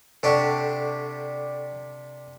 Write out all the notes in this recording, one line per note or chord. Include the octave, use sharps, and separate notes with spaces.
C3 D4 G4 A4 D5 F#5 C#6